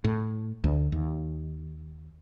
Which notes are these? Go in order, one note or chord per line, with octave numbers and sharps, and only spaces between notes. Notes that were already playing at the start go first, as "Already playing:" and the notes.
A2
D2
D#2